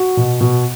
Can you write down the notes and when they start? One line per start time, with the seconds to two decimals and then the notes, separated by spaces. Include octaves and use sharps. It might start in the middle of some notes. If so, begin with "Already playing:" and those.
Already playing: F#4
0.17 B2
0.41 B2